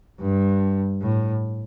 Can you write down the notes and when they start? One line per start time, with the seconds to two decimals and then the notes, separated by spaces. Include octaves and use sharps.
0.20 G2
1.01 A2